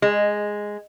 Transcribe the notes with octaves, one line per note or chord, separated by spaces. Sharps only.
G#3